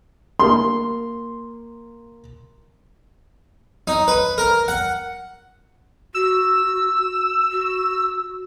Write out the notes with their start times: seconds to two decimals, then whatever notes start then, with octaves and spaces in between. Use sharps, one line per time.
0.40 A#3 C6
3.88 D#4
4.08 B4
4.38 A#4
4.68 F#5
6.15 F#4 E6
7.52 F#4